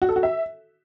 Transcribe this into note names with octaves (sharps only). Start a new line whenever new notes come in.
F#4
A4
F#4
E5